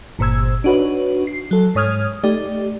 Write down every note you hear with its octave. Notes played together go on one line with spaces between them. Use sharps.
G1 A#2 C5 E6 G#6
D4 D#4 F#4 B4 C#5
C7
F#3 A4
G#2 C#5 D#6 F6 G#6
A3 D#4 G4 D5